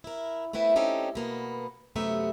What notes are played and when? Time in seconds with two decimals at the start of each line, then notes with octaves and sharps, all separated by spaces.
0.04 E4 A#4
0.53 A3 B3 C4 E4 B4
0.76 C4 C#4 D#4 G4 A4
1.15 B2 A#3 B3
1.96 F#2 C3 A3 B3 E5 A#5